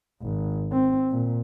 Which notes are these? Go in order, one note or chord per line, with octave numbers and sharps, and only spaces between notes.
G#1
C4
A#2